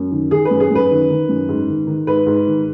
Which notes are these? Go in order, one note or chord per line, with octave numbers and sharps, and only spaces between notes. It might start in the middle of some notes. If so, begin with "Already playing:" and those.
Already playing: F#2
D#3
D#3 G#4
B4
F#2
G#4
F#2 B4
D#3
D#3
F#2
G#2
D#3
D#3
G#2 B4
G#2
D#3